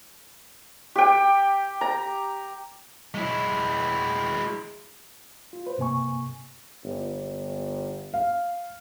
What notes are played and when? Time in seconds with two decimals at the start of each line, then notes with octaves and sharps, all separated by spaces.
0.96 G4 G5
1.81 A#5
3.14 G#3 E4
5.53 F4
5.66 B4 C5
5.78 G2 C3 A#3 G#5 C#6
6.84 G1
8.14 F5